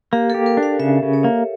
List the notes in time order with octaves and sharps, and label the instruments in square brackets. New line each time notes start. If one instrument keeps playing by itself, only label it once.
[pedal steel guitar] A#3 [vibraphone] G4
[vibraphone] A4
[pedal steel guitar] G4
[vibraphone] A#4
[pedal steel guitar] D4
[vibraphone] F5
[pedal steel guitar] C#3 [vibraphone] E5
[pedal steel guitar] C#3
[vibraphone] C#5
[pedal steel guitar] A#3